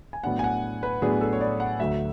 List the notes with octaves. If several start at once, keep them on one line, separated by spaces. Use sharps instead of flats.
G#5
A2 F#3 B3 D4 F#5
G#5
F#5
B4
A2 F#3 B3 D4 G#4
A4
C#5
D5
F#5
D2 D3 F#3 A3 E5